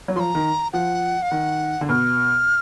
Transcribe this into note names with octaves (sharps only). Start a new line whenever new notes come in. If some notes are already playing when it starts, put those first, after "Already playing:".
F#3
F3 A#5 C6
D#3
F3 F#5
F5
D#3 F#5
D3
B2 F6